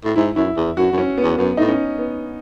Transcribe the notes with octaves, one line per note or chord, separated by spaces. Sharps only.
A2
G#2 E4
F#2 E4
E2
F#2 F#4
F#2
C#4
B3
E2
F#2 B3
A2 D#4
C#4
B3